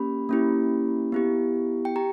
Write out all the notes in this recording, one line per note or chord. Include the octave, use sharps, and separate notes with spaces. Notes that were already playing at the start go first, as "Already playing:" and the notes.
Already playing: A#3 C#4 G4 B5
A#3 C#4 E4 G4
B3 E4 G4
G5
G4 A#5